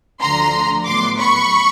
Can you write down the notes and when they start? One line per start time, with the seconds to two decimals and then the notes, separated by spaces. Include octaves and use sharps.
0.21 D2 D3 F3 A#5 C6
0.86 A2 F#3 B3 C6 D6
1.19 B5 C#6